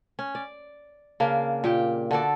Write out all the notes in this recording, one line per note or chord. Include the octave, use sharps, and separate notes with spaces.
C#4
D5
C#3 A#3 D4
A#2 G4 G5
D3 F#4 A4 D5